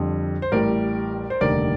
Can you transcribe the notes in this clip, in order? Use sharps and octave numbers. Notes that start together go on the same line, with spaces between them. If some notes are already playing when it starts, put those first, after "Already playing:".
Already playing: F2 D3 G3
C5
A1 A2 G3 A#4 D5
C5
F1 D#2 D3 G3 A#4 D5